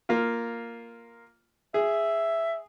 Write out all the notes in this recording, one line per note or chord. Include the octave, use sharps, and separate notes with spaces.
A#3 F4
G#4 E5